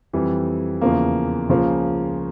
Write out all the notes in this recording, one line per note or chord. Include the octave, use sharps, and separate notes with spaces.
F2 E3 G3
E2 C#3 F3 A#3
C#2 C#3 F3 A#3